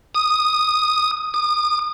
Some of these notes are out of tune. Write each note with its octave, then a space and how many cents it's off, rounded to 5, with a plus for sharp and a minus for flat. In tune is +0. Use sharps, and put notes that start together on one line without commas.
D#6 -5
D#6 -35